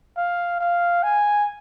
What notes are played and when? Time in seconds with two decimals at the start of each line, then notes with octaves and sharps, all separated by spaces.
0.17 F5
0.60 F5
1.03 G#5